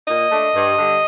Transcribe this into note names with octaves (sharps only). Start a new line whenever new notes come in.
A#2 D#5
A3 D4
G2
D3 G3